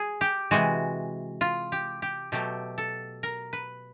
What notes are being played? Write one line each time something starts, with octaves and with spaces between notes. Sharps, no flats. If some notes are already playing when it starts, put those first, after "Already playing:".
Already playing: G#4
G4
C3 E3 G#3 F#4
F4
G4
G4
B2 F#3 A3 G4
A4
A#4
B4